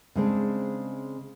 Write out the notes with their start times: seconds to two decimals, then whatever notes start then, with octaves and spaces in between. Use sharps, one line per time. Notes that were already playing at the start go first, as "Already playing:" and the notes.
0.15 C#3 G#3 C4 D4